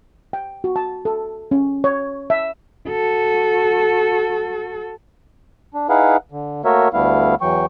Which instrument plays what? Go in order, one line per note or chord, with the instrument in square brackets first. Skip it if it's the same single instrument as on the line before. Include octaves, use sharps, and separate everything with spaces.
[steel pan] G5
F#4
A5
A4
C#4
C#5
E5
[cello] F#4 A4
[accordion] D4
D#4 E4 G#4 B4 F5 F#5
D3
A3 A#3 F#4 A#4 C#5 E5
D2 G3 A3 B3 E4 F5
E2 E3 F#3 G5 C#6